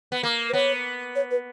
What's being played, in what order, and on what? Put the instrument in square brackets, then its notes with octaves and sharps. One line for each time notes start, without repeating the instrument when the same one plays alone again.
[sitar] B3
A#3
[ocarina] B4
[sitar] B3 [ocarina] C#5
[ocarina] C#5
B4